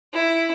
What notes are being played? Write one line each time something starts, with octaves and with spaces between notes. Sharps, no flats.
E4